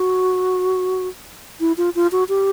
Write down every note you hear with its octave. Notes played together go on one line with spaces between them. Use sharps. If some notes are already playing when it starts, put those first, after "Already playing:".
Already playing: F#4
E4
F4
F4
F#4
G4